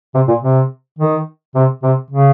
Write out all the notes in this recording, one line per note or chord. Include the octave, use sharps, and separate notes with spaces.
C3
A#2
C3
D#3
C3
C3
C#3